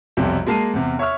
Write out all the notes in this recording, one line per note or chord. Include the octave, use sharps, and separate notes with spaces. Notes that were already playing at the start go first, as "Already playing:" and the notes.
B1 F2 C3 G3
G#3 A#3 A5 F6 C7 D#7
E2 C3
C#5 E5 C#6 F6